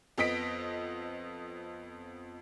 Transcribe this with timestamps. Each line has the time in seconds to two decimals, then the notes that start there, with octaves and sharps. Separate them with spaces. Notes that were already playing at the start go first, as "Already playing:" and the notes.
0.18 F2 B3 D#5 B6 D7